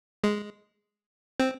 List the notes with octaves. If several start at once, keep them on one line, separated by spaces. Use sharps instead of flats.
G#3
C4